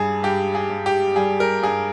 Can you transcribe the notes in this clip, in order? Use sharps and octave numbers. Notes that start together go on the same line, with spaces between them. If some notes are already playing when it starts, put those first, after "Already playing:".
Already playing: G2 G3 G#4
G2 G4
G#4
G2
G4
G3 G#4
A#4
G2 G#4